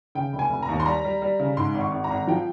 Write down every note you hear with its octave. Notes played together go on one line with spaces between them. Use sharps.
C#3 G5
F1
G#5
F1
A#5
D#2
C6
G3 A#5
G3
G3
C#3
G#2 C6
G#1
C#6
G#1
A#5
G#1
F3 G5